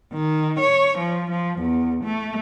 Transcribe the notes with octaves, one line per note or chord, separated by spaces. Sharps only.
D#3
C#5
F3
F3
E2
A3